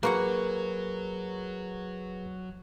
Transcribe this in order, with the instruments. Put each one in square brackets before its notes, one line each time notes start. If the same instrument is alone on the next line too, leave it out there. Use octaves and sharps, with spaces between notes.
[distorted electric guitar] F#3 [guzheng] A#3 F#4 F#5 [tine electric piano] G#4 B4